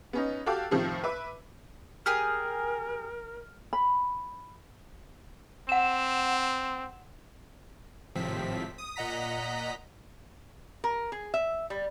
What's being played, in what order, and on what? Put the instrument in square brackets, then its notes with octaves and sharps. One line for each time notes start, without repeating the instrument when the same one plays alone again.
[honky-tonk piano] B3 C#4 D#4
F#4 G4 A4 F5 D6
A2 C3 D#3 F3
B4 E5 D6
[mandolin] G4 G#4 D#6 [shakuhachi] A#4 [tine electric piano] F6
[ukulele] B5
[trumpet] C4 [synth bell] F#5 E7
[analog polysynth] G#1 A2 C3 F3 C4 B6
D#6
A#2 D#5 F#5 A#5 B6
[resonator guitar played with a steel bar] A#4
G#4
E5
G3